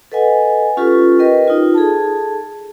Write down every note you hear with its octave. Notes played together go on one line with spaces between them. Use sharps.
A4 B4 D#5 F#5 G#5
C#4 F4 G4 A4 B4
G4 A#4 B4 D#5 G5
D#4 F4
G#4 A4 A5